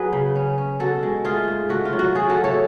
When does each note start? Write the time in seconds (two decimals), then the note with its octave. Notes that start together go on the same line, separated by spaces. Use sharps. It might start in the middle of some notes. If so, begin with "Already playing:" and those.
Already playing: F#3 F#4 G#4 B4
0.13 C#3
0.35 C#4
0.58 C#4
0.80 B2 F#4 A4
1.03 G#3
1.24 A3 F4 G#4
1.48 G#2
1.69 A3 F#4
1.85 F4
1.93 F#3
1.99 F#4
2.15 C#4 F4 G#4
2.30 F#4 A4
2.37 A3
2.44 A4 C#5